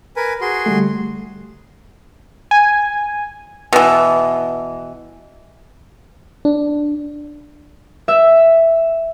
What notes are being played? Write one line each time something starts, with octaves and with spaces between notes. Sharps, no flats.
A#4 B4 G#5
F#4 G#4 C6
D3 G3 A3
G#5
B2 E3
D4
E5